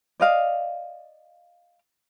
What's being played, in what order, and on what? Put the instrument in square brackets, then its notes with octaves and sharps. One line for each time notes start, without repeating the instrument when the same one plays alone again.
[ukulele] D5 D#5 F5